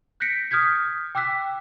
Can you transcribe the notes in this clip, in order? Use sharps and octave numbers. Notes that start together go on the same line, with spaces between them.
F#6 G6 A#6 B6 C#7 D7
D#6 F6 G6 G#6 B6
G5 D6 E6 F#6 B6